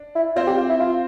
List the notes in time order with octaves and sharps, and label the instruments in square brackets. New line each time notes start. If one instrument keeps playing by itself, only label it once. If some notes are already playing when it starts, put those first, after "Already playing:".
Already playing: [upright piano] D4
[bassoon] E4
[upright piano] C4 C5 [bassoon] F4
[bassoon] G4
F4
E4
F4